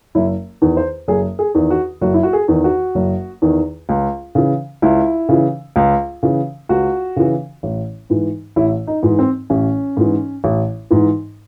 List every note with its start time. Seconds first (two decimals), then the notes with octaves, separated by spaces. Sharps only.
0.15 F#1 E4
0.61 E2 D#3
0.77 C5
1.08 F#1 G#4
1.39 G#4
1.55 E2 D#3
1.70 F#4
2.01 F#1 F#4
2.14 E4
2.23 F#4
2.33 G#4
2.48 E2 D#3
2.64 F#4
2.95 F#1
3.42 E2 D#3
3.89 C#2
4.35 C#3 E3
4.82 C#2 E4
5.29 C#3 E3
5.76 C#2
6.23 C#3 E3
6.69 C#2 F#4
7.16 C#3 E3
7.63 A1
8.10 G#2 E3
8.56 A1 E4
8.87 D#4
9.03 G#2 E3
9.19 C4
9.50 A1 C#4
9.97 G#2 E3
10.44 A1
10.91 G#2 E3